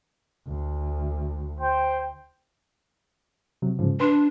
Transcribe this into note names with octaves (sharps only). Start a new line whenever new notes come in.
D2
C5 G5
C3 F#3
G#2 C#3 F3
D4 B4 C6